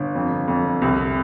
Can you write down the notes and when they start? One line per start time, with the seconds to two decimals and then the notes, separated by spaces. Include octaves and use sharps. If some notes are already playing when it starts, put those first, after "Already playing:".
Already playing: G1
0.15 F2
0.48 F2
0.82 C2